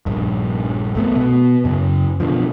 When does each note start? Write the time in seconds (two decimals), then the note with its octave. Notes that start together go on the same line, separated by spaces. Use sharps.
0.06 A#1 G2
0.95 C2 A3 B3
1.16 B2 B3
1.65 F#2 C#3
2.20 B2 D3 F3